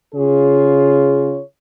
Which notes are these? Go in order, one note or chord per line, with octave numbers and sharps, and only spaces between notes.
C#3 F4 G#4 C#5